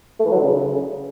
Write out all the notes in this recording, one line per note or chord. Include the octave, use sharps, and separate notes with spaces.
A3
E3
F#3
D3
C#3